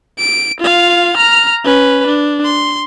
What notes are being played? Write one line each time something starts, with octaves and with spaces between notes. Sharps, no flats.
D7
F4 F5
A#5 F6
C#4 B4
D4
C6